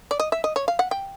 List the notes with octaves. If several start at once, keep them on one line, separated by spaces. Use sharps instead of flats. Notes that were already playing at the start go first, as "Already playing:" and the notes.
D5
D#5
E5
D#5
C#5
F5
F#5
G5